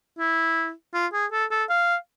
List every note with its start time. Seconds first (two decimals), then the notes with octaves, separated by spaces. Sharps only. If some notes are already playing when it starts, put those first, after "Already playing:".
0.19 E4
0.94 F4
1.13 G#4
1.32 A4
1.51 A4
1.69 F5